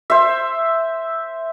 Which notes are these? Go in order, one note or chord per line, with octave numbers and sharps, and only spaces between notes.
C5 E5